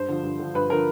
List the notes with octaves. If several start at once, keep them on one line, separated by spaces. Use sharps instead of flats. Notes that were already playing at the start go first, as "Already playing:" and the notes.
Already playing: G2 C5
D3 F3
G2
D3 F3
G2 B4
D3 F3 A#4